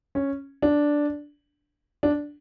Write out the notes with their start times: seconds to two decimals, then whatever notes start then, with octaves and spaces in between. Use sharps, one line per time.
0.15 C#4
0.62 D4
2.03 D4